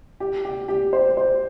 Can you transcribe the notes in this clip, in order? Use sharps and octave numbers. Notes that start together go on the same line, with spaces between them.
G4
G4
G4
C5
C5